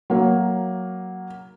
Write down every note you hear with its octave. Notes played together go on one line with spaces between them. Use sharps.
F#3 A#3